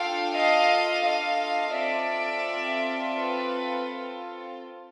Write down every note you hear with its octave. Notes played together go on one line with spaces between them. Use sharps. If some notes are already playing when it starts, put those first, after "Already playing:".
Already playing: D4 F4 A4 F5 G5
D#5 F5
D#5 F5
C4 F4 A4 D5 E5
B4